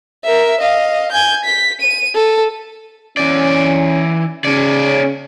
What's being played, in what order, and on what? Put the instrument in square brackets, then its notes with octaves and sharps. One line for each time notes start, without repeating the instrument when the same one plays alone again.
[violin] A#4 E5
D#5 F5
G#5 G6
B6
D#7
A4
[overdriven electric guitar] E3 D5 [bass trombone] C#4
[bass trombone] C#3 [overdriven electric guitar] C#4 D5